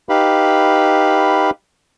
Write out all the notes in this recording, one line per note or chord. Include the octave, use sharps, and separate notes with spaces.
D#4 G4 B4 F5 B5